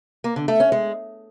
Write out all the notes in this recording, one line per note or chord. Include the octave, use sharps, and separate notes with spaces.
A#3
D3
A3
C#4
G#3